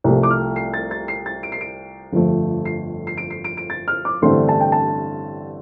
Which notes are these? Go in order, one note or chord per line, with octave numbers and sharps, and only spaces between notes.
C2 C3 F3 A3
D6
F6
C7
A6
A6
C7
A6
D7
C7
D7
G1 F2 F3 A3
C7
C7
D7
C7
D7
D7
A6
F6
D6
A1 G2 D3 A3 C4 C6
A5
G5
A5